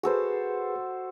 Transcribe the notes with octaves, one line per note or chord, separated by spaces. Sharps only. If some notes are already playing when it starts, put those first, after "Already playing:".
F#4 G#4 A4 B4 C5